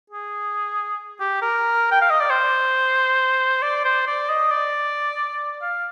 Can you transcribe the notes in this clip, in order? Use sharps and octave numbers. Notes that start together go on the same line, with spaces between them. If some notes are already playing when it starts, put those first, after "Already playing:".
G#4
G4
A#4
G5
F5
D#5
D5
C5
D5
C5
D5
D#5
D5
F5